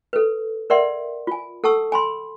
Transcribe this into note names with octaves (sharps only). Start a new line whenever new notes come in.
A4 B4
A#4 B4 D5 E5 F#5 C6
F4 G#5
A4 F#5 A5 C#6 E6
G#5 B5 C6